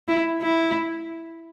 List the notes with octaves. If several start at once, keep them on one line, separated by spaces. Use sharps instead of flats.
E4
E4